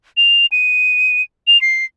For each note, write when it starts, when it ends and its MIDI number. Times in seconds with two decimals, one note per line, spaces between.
0.17 0.46 101
0.52 1.22 99
1.47 1.60 101
1.61 1.85 96